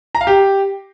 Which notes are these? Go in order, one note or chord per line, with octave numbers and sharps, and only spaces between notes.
A#5
F5
G4